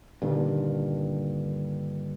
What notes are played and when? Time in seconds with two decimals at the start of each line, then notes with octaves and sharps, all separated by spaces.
0.22 G2 A#2 D3 D#3